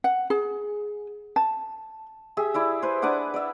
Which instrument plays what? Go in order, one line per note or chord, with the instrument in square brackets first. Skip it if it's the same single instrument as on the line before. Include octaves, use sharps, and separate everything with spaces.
[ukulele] F#5
G#4
A5
[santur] G4 G#4 E5
E4 D5 E5
B4 C5
D4 B4 F#5 D6
D5 E5